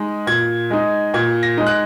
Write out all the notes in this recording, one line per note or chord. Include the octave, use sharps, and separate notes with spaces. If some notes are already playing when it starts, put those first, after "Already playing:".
Already playing: G#3 D#4
A#2 G#6
G#3 D#4
A#2 G#6
A#6
G#3 D#4
F#6